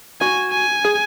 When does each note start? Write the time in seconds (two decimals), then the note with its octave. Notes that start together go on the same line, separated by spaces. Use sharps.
0.21 F#4 G#5
0.52 G#5
0.84 G#4